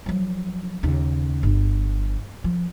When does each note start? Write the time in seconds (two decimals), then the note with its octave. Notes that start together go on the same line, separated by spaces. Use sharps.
0.06 F3 F#3
0.83 D#2 C#3
1.43 G1
2.44 F3